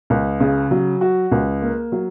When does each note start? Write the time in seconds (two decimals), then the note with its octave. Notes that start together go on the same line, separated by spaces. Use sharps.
0.10 C#2
0.40 C#3
0.71 F#3
1.01 F#4
1.32 C#2
1.62 A#3
1.92 F#3